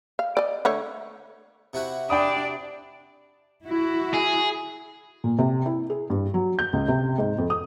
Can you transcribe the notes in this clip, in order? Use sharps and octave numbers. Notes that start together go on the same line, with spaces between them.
F5
D5 D#5
D3 A3 C#5
C3 E4 F#4
D4 D5 G5 B5 D#6
E4 F#4
G#4
A#2
C3
E4
G#4
G2
F#3
G6
C#2
C3
G#2
F2
D#6